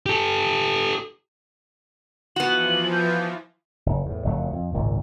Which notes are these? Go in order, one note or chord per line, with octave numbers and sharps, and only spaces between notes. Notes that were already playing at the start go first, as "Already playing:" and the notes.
G4 A4
E3 F3 B3 F#4 F#7
G6
F#1
E2 A2
F#1 F2 F#3 A3
F2
G#1 C#2 A#2